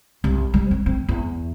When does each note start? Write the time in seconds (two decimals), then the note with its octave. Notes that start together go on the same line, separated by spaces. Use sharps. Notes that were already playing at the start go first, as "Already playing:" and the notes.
0.24 C2
0.54 G3
0.71 C4
0.86 C4
1.09 E2